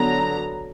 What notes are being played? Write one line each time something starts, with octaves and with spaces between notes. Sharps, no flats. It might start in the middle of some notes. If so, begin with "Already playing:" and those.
Already playing: D3 F#3 B3 A#5